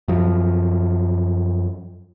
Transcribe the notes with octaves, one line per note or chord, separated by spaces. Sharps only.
F#2 F3